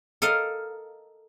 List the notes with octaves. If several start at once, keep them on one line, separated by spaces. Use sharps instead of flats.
A4 A#4 D#5 F5